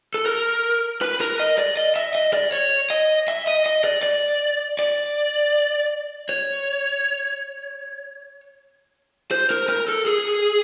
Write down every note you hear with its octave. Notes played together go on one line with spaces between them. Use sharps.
A4
A#4
B4
A#4
D#5
D5
D#5
E5
D#5
D5
C#5
D#5
E5
D#5
D#5
D5
D5
D5
C#5
C5
A#4
A#4
A4
G#4